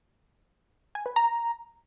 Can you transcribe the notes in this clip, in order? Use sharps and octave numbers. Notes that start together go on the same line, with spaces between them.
G#5
B4
A#5